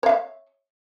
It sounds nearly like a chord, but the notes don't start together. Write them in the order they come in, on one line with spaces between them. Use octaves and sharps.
C#5 F5 E5